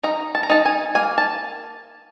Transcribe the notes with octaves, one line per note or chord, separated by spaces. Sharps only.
D#4 A#5
A5
A#5
D#4 A5
G#5
A#3 G#5
A5